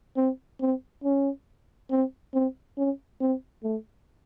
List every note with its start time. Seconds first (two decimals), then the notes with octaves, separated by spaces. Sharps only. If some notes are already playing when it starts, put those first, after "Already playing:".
0.16 C4
0.60 C4
1.03 C#4
1.90 C4
2.34 C4
2.77 C#4
3.20 C4
3.63 A3